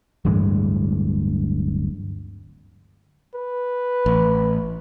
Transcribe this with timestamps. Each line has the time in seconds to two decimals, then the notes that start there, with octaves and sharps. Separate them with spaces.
0.25 D1 G2 E3 G#3
3.35 B4
4.06 A1